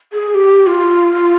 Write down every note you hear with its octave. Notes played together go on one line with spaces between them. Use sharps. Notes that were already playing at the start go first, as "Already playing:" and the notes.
G#4
G4
F4